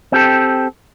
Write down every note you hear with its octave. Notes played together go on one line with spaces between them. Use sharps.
C4 G4 A4